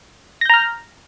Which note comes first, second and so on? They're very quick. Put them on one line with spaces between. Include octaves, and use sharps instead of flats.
A#6 G6 A#5 F6